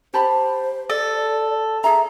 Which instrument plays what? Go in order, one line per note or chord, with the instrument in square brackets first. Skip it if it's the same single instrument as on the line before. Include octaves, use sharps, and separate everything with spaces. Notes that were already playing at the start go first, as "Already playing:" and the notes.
[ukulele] G4 A5 B5 [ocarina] C5
[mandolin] A4 [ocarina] D5
[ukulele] G#4 A#5 [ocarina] E5